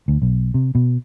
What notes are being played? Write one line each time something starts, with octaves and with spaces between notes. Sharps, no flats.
D2
B1
C3
B2